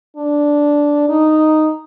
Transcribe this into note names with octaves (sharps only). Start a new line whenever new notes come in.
D4
D#4